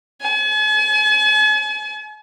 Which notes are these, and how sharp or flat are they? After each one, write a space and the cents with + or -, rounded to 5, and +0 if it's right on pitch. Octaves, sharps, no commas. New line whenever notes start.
G#5 +45